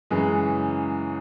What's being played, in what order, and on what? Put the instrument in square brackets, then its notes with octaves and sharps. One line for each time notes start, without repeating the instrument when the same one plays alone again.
[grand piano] F#2 C#3 E3 G#3